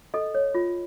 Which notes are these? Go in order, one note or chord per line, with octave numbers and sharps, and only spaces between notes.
A4 D#5
C#5
F4